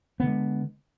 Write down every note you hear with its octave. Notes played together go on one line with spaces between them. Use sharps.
D3 G#3 B3